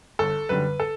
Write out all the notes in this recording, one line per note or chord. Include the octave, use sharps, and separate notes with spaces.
G1 A4
F#2 D3 G3 B4
A4